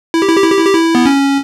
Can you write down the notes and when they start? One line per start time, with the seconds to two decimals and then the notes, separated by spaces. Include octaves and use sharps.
0.14 E4
0.22 G4
0.29 E4
0.37 G4
0.44 E4
0.52 G4
0.59 E4
0.66 G4
0.74 E4
0.95 B3
1.06 C#4